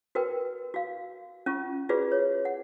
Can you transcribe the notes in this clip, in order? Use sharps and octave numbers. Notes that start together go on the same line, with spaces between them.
F#4 A#4 B4 G5
F#4 F5
C#4 F4 C#6
F4 F#4 G#4 B4 D5
C#5
F#5